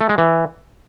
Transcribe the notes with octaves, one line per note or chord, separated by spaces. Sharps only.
A3
G#3
E3